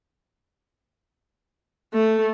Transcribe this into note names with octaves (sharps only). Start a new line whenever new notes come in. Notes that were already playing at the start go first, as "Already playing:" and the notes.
A3